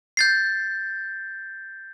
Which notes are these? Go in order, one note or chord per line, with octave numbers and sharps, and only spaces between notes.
G6 A6 C7